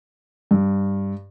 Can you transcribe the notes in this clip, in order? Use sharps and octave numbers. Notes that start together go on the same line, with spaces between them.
G2